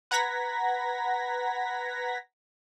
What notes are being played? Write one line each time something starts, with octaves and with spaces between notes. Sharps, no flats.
B4 F#5 A#5 G#6 A#6 B6